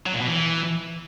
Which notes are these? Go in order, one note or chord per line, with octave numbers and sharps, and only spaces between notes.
F#3
A#2
B2
E3